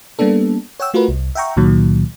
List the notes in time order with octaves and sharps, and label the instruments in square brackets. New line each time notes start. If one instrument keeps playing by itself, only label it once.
[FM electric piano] G3 A#3 B3 D4 A4
C#5 F#5 G5 E6
A3 F4 F#4 A#4 B4
C2
E5 F#5 G5 A#5 C#6
C#2 A#2 D#3 F#3